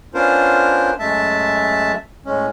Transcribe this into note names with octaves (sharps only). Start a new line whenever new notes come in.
B3 C#4 D4 F4 A#4 C5
F#2 G#3 A3 E5 A5
A2 G#3 C#4